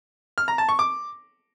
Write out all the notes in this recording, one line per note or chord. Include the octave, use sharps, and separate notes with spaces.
F6
A#5
A5
C#6
D6